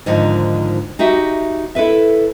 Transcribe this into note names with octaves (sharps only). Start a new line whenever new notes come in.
G#2 D3 D#3 F3
D#4 F#4 G4 E5
E4 A4 B4 E5